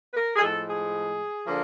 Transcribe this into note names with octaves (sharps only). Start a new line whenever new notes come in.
B4
A#4
G#4
A2 F3 G#3 A4
G#4
D3 F3 A#3